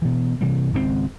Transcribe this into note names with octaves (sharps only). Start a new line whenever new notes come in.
B2 E3
C3 E3 G3
G#1 C#2 B2 C4